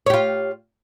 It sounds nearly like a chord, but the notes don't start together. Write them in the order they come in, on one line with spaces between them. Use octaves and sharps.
C#5 G4 F4